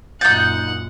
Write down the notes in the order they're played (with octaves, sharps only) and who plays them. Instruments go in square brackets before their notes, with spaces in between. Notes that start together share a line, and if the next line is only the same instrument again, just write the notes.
[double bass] F#2 A#2 [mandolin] D#4 G6 [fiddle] F#5 [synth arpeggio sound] A6